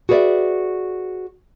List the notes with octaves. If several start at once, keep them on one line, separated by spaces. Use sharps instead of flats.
F#4 G#4 B4 C#5 D5 E5